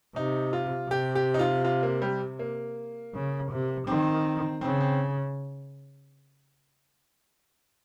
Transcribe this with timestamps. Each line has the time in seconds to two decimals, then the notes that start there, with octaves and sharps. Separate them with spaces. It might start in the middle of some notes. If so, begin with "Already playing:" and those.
0.16 C3 D#4
0.53 F4
0.90 C3 G4
1.15 G4
1.34 D#4
1.39 F4
1.65 F4
1.83 A#3
2.02 G3
2.39 A#3
3.14 C#3
3.51 C3
3.87 D#3 C4
4.61 C#3 C4
4.81 C4